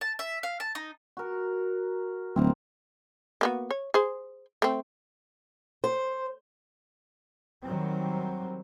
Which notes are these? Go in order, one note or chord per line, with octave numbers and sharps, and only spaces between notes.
A5
E5
F5
A5
D#4
F#4 A#4
D1 A#3 C4
A#3 B3 F#4
C#5
G#4 C5
A3 C4
C5
D#3 F#3 G3 C4